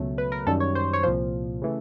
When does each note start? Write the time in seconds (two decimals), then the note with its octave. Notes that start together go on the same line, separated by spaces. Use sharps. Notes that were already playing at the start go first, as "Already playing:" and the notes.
Already playing: C#2 B2 F#3 A3
0.18 B4
0.32 A#4
0.47 F#2 D#3 G3 A4
0.60 C#5
0.75 C5
0.93 C#5
1.03 C2 A#2 F3 C5
1.62 C#3 E3 A3